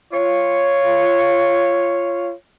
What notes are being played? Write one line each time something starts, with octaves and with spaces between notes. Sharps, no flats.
F4 C#5